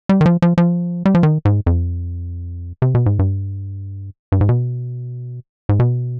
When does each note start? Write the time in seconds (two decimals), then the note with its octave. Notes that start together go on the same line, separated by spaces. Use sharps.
0.09 G3
0.21 D#3
0.26 F3
0.42 F3
0.58 F3
1.05 G3
1.15 F3
1.23 D#3
1.45 G#2
1.66 F2
2.82 C3
2.95 B2
3.06 G#2
3.19 G2
4.32 G2
4.41 G#2
4.49 B2
5.69 G#2
5.80 B2